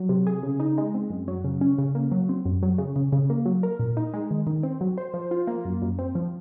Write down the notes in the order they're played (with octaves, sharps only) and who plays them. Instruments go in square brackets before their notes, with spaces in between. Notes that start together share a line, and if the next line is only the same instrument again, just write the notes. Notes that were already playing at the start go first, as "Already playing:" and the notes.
Already playing: [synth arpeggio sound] F#3
C3
G#4
C#3
D#4
G#3
C4
F#2
F#3
C#3
C#4
C#3
A#3
F#3
C4
F#2
F#3
C#3
C#3
C#3
A#3
F#3
A#4
A#2
D#4
G#3
D#3
D#3
C4
F#3
C5
F3
F4
A#3
F#2
F#2
C4
F3